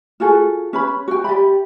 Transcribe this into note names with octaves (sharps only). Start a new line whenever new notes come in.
F4 F#4 G#4 A4
C#4 B4 B5
F#4 G5
G4 D5 E5 B5